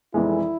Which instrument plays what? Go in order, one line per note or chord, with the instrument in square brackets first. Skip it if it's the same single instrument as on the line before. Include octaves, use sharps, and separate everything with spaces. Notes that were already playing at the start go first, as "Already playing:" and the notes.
[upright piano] F1 F2 E3 G#3 [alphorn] E4